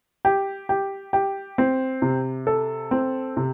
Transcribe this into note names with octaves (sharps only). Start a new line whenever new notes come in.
G4
G4
G4
C4
C3
A4
C4
C3